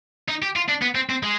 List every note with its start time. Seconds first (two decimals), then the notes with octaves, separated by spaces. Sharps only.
0.28 D#4
0.42 G4
0.56 F4
0.69 D4
0.82 B3
0.95 C4
1.09 C4
1.23 G#3